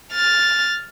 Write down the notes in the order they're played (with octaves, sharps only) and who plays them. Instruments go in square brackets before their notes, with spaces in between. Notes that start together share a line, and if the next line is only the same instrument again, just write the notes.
[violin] F6 A6